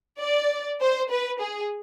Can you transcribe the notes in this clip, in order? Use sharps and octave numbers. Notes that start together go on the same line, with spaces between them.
D5
C5
B4
G#4